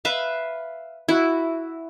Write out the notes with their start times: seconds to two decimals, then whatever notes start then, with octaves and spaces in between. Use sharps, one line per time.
0.05 B4 E5 F5
1.08 E4 F#4